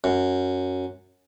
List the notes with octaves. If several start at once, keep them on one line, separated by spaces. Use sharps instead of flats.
F#2